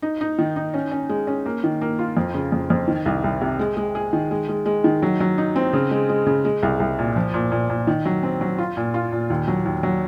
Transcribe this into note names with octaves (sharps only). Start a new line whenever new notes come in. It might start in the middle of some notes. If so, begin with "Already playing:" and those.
D#4
D#4
D#3
D#4
C#4
C#4
G#3
C#4
A#3
D#3
A#3
F4
F2
C#3
F2
F2
D#3
C2
C2
C3
G#3
G#3
G#4
D#3
G#3
G#3
G#3
D#3
F#3
F#3
D#4
C4
C#3
G#3
G#3
C#3
G#3
C2
C2
A#2
F3
A#2
A#2
A#2
D#3
F#3
C4
F#3
F4
A#2
F4
A#2
D#2
F#3
D#2
F#3